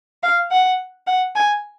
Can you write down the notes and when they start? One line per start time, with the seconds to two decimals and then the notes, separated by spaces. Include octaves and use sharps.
0.23 F5
0.51 F#5
1.07 F#5
1.35 G#5